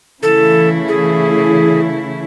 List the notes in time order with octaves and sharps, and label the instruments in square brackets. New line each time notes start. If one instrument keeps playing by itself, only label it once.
[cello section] C#3 E3 A3 E4 [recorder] A4
[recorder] G#4